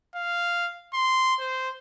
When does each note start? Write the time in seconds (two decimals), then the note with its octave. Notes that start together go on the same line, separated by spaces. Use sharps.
0.15 F5
0.94 C6
1.40 C5